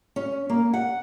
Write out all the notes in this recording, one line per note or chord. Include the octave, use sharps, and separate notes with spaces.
C#4
A#3
F#5